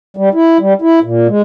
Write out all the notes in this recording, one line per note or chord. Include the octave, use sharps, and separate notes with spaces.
G3
E4
G3
E4
A#2
G#3